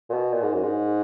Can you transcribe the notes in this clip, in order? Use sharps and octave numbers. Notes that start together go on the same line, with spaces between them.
A#2
B2
A#2
G#2
F#2
G#2